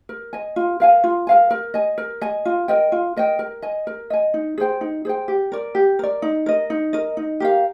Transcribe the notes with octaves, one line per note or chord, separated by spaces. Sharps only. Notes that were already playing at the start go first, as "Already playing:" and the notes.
A#4
D#5 G#5
F4
A#4 F5 G#5
F4
A#4 F5 G#5
A#4
D#5 G#5
A#4
D#5 G#5
F4
A#4 D#5 G5
F4
A#4 D#5 G5
A#4
D#5 G#5
A#4
D#5 G#5
D#4
G#4 C5 G5
D#4
G#4 C5 G5
G4
A#4 D5
G4
A#4 D5
D#4
A#4 D#5
D#4
A#4 D#5
D#4
G4 A#4 F5